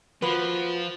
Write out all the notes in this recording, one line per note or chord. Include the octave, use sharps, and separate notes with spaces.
F3 A#3 F4 F#4 B4